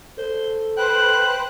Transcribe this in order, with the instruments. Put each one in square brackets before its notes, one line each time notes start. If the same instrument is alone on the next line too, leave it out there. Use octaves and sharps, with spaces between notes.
[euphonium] A4 [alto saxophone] C5
[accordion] B4 C5 [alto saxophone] G5 [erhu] F#6